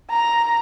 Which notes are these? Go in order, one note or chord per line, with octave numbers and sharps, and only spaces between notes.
A#5